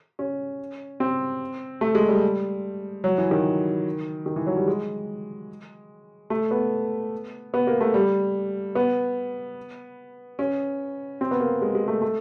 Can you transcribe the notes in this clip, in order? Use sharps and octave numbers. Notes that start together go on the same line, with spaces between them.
C#4
C4
A3
G#3
G3
F#3
E3
D#3
D#3
E3
F#3
G3
G#3
A3
B3
B3
A#3
A3
G3
B3
C#4
C4
B3
A#3
G#3
G#3
A3
A3